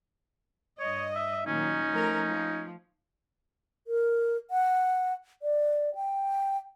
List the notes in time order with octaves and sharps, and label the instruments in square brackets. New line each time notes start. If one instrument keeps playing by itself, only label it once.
[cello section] G2 D#5 [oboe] C#5
[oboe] E5
[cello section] A#2 D#3 F#3 [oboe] C#4 [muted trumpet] D#4
[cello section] F3 A3 A#4
F3
[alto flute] A#4
F#5
D5
G5